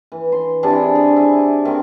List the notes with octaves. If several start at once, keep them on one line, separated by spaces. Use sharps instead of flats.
E3
C6
C3 D4 E4 G#4
G#4
E4 G#5
D#3 C4